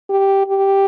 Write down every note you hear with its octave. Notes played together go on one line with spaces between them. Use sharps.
G4
G4